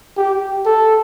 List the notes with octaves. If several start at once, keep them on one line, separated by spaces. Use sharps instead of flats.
G4
A4